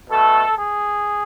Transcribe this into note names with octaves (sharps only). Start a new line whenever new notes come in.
B2 A3 A4
G#4